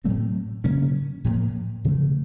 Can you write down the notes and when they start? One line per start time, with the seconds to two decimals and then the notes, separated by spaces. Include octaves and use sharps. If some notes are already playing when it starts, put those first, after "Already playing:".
0.04 A2 F#3 A3 C4
0.64 C#3 F#3 A#3 C#4
1.25 A2 F3 A#3
1.85 C#3 F3 A3